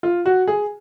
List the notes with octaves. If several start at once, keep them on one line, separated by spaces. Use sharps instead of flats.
F4
F#4
G#4